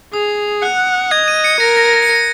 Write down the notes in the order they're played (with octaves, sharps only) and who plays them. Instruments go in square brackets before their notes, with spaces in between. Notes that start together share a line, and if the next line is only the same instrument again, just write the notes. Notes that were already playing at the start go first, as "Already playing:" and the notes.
[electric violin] G#4 [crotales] D#6
[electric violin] F#5 [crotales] F#6
[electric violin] D#5 [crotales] G#6
[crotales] D#7
C#7
[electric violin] A#4 [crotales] A#6
[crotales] A#6
A#6
C#7
A#6